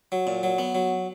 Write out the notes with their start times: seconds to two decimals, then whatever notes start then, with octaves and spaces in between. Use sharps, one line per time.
0.12 F#3
0.27 A#2
0.43 F#3
0.59 B3
0.75 F#3